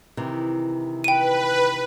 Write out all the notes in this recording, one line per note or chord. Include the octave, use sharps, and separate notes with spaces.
C3 D#3 E3
B4 G5 D#7